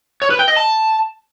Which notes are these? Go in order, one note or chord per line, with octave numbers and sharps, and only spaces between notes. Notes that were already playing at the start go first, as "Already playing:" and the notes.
C#5
B4
G5
D#5
A5